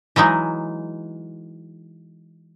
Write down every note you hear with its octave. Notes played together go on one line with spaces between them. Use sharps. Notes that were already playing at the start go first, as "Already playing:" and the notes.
E3 F#3 G#3 D#4